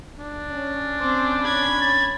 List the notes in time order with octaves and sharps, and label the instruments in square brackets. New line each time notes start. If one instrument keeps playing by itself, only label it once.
[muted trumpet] D4
[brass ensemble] C#4
[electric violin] C4 C5 [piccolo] D6
[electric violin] B5 G#6
[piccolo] A6